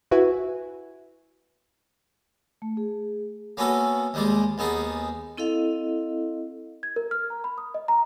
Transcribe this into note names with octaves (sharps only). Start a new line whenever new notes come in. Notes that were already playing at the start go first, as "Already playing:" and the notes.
E4 F#4 B4 E5 G#5
A3
G#4
A#3 B3 C#4 F#4 A4 B4
D#2 G3 G#3 D5
D#2 B3 D#4 G#4 A5
C4 E4 A4 D#5 F5
G#6
A#4
F6
A#5
B5
D#6
D#5
A#5